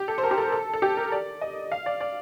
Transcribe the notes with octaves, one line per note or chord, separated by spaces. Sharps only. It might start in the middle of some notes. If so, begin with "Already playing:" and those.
Already playing: G4
A4
C5
A#4
G4
A4
A4
A4
G4
A#4
D5
D#5
F5
D5
D5